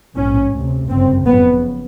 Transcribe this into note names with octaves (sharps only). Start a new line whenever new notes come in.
A#1 G#2 C#4
D2 C3
G1 F#2 C#3 C4
F#1 F2 C#3 B3